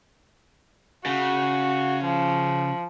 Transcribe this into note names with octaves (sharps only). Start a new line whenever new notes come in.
C#3 F#4
F3